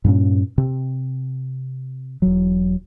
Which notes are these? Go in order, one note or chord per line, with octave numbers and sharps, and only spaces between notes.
G2 A#2 C#4
C3
E1 F#3